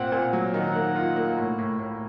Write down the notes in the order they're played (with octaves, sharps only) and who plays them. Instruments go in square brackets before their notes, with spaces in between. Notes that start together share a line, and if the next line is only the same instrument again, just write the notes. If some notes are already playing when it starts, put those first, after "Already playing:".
Already playing: [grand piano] A#2 C4 [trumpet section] F#5
[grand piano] A#2
F#3
[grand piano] D#3 [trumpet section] F#5
[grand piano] A#3
F4
A#3
A2
A2
A2